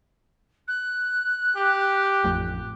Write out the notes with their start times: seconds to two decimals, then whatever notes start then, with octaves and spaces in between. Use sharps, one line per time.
0.68 F#6
1.57 G4
2.24 A1 F2